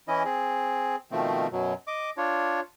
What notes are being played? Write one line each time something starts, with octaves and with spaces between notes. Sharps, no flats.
E3 C#4 E4 D#5
C4 G#4
B2 D#3 F3 A3 C4
F#2 B2 F#3
D#5 D6
D4 F4 C#5